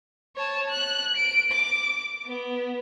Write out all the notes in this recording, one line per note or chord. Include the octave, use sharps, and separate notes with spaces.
C#5 A5
F#6
D7
D6
B3